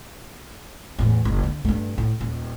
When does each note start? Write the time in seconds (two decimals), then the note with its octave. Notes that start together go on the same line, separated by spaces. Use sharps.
0.99 E2 A2
1.25 F#1
1.43 D3
1.65 G2 A3
1.98 A2
2.21 D#1